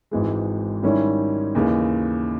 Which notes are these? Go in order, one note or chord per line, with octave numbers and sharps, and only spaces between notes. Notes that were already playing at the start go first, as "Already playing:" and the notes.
G#1 G#2 E3 G#3
G#2 D#3 G3 C#4 E4
D#2 C#3 E3